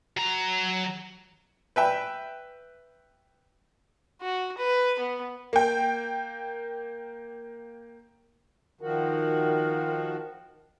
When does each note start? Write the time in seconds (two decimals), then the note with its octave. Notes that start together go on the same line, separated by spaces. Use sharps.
0.17 F#3 A#5
1.76 B4 E5 G5
4.22 F#4
4.58 B4
4.99 B3
5.53 A#3 G5
8.81 D#3 F3 F#4 A#4